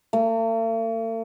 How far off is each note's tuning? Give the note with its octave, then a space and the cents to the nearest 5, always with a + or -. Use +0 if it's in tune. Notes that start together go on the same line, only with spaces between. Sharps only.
A3 +45